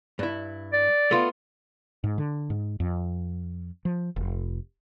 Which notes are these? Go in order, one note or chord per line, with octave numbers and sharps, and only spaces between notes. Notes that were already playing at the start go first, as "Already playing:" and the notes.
G2 E4
D5
A3 B3 F4
G#2
D3
G#2
F2
F3
F1